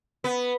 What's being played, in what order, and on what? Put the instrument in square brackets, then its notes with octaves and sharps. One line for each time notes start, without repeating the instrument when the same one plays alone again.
[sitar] B3